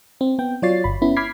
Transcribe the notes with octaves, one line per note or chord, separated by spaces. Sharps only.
C4
B3 G5
F#3 F4 C#5 D5 A6 C7
G1 B5
B3 C#4 E4 B5
B5 D6 F6 G#6 B6 C7